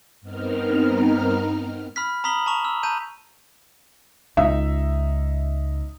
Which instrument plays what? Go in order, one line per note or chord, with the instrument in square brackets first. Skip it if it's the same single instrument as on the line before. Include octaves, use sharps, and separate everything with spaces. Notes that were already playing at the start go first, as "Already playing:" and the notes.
[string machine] G2 B3 C4 D#4 A#4 F6
[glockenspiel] B5 F6 B6
A#5 B5 D#6 B6 F#7 G7
A5 A#5 C#6 F7
E6
A5 A#5 G6 D#7
[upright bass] C#2 [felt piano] D#4 E5